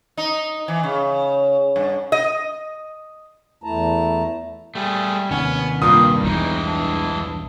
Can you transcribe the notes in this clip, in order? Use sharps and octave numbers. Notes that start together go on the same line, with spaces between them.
D#4
E3
C#3
G2
D#5
E2 A3 E4 A5 A#5
G3 A3 G#4
D#2 C3 D#3 B3 C#4
G2 A#2 D#6
B1 E2 G2 E3 G#3 D#4
D4